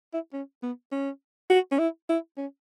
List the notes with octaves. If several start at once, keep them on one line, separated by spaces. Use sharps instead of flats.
E4
C#4
B3
C#4
F#4
C#4
E4
E4
C#4